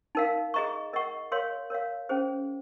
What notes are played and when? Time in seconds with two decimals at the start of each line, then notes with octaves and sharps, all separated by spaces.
0.15 D#4 A#4 F5
0.54 G#4 D#5 A#5 C#6
0.93 A#4 D#5 F#5 C#6
1.32 A#4 C#5 F5 C6
1.70 A#4 C#5 F5
2.09 C#4 G#4 C5